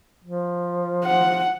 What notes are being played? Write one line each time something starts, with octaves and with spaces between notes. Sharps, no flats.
F3
F#5